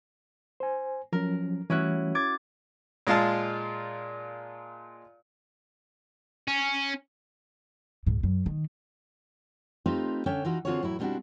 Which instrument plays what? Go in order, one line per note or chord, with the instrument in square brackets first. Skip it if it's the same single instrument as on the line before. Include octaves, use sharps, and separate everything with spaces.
[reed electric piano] C5 G#5
[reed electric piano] F3 F#3 C#4 [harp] A#4
[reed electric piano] E3 G3 A3 [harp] C#4 E4 F#4
[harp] D6 G#6 A6
[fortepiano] A#2 G#3 F4 F5 A5
[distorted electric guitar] C#4
[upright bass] C#2 G#2
F#2
D#3
[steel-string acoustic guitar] A3 C4 D#4 F4 G4 B4
D3 C#4 A4 C#5 G5
E3 D#4 F4 F#4
D3 C4 F4 F#4 G#4 C#5
A2 F#3 E4
B2 G3 C4 D4 E4 F#4